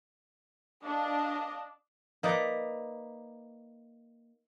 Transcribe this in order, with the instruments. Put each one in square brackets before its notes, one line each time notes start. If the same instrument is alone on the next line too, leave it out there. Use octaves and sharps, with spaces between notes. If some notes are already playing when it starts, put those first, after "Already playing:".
[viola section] D4 [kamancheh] D#5 F5
[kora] A#3 D#4 B4 D5